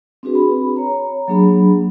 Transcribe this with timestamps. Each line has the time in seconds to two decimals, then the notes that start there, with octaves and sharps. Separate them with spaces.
0.23 C4 D4 F#4 G#4 B4
0.35 B5
0.76 C#5 A#5
1.28 F#3 A#3 D4 G#4 B5